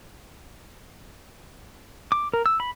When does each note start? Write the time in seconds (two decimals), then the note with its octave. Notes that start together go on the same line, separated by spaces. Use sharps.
2.12 D6
2.34 A#4
2.46 E6
2.60 B5